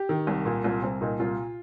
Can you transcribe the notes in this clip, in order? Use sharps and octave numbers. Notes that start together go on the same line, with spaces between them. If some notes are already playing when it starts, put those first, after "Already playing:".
Already playing: G4
D#3
C2
A#2
C2 F4
C2 C4
A#2 D#4
C2 F4